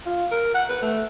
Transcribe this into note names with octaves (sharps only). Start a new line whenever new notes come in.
F4
A#4
F#5
B4
A3